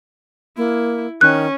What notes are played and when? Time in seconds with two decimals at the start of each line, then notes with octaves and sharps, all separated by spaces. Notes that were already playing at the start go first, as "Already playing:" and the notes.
0.57 A#3 E4
1.21 D#3 C#4 F#6